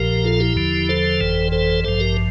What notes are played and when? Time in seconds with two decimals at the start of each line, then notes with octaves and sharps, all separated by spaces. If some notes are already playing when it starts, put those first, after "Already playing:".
Already playing: A#1 A#2 F3 G4 A#4
0.24 F4 A4
0.40 E4 G4
0.56 E2 D3 F3
0.89 A4 C5
1.20 G1 F2 E3
1.52 A4 C5
1.84 A1 G2 F3 A4 C5
2.00 G4 A#4